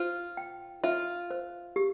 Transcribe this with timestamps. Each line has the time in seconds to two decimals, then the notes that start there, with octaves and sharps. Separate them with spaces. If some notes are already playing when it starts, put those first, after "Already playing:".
Already playing: F4 C5
0.37 G5
0.84 F4 E5
1.31 C5
1.76 G4